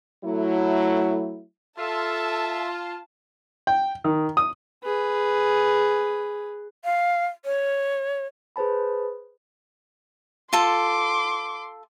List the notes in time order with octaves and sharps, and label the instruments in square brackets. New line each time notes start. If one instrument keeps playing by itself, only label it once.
[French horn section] F#3 A3 E4
[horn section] F4 [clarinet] A4 [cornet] E5 [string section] A5
[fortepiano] G5
D#3
D#6
[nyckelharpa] G#4 B4
[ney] F5
C#5
[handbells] G#4 B4 C5 A5 B5
[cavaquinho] F4 A4 [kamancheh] C6 D6